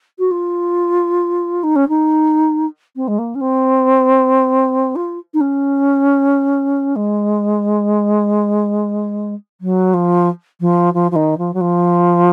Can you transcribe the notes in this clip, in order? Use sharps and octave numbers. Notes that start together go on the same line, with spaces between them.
F#4
F4
D#4
C#4
D#4
C4
G#3
A#3
C#4
C4
F4
D#4
C#4
G#3
F#3
F3
F3
F3
F3
D#3
F3
F#3
F3